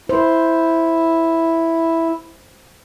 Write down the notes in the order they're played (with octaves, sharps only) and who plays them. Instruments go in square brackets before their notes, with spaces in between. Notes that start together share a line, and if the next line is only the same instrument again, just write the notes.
[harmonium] E4 [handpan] C5